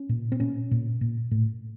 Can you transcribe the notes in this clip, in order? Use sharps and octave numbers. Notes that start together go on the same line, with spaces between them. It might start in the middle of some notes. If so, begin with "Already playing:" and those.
Already playing: C#4
A#2
C4
A#2 C#4
A#2
A#2
A2